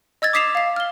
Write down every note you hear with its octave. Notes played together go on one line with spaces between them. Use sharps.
D#5 E6 G#6 A6
D6 D#6 B6 C7 E7 F7
F5 C7
F6 G7